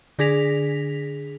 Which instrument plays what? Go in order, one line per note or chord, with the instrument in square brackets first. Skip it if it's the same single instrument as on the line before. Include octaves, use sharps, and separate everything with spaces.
[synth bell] D3 D4 G#4 A#6 B6 F7